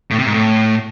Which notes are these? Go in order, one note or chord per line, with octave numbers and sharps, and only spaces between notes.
A2
C3
G#2
A2